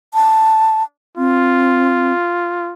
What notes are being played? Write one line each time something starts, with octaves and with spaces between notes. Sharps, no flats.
A5
C4 F4